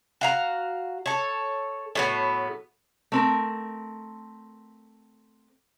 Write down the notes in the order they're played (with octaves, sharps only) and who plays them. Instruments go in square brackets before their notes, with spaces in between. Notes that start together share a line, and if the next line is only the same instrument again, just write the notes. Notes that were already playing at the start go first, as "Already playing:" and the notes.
[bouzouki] F#4 F5 A#5
A4 C#5
A2 F#3 B3
[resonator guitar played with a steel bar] A3 C4 A#4